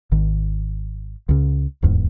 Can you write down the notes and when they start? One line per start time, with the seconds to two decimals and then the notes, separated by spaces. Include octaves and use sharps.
0.12 G#1 D#3
1.29 C#2 C#3
1.82 D1 E2 G#2